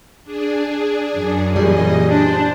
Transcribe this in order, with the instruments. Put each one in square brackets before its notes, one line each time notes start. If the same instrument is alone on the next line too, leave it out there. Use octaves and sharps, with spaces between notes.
[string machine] D4 G#4
[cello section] F#2
[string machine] A#2 E3 D#5 [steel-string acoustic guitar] G3 G#4
[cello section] D4 [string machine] C5